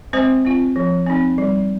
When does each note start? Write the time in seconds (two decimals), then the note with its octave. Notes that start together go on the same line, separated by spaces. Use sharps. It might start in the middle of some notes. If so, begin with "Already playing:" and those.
0.13 G#3 C4 C5
0.45 C4 F4
0.76 F3
1.06 C4 D#4
1.38 G3